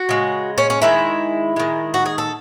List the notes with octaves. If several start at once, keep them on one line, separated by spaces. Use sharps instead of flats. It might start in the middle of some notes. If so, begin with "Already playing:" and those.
Already playing: F#4
C#3 G#3
C#4
C#4
D#3 G#3 E4
D#3 G#3
F#4
G#4
A4